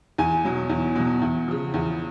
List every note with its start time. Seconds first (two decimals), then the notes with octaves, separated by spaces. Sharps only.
0.18 E2 G#5
0.45 B2 F#3
0.70 E2
0.96 B2 F#3
1.22 E2
1.48 C#3 F3
1.74 E2